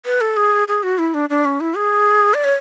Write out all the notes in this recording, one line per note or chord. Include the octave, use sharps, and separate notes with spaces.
B4
A4
G#4
G#4
F#4
E4
D4
D4
C#4
E4
G#4
D5
C#5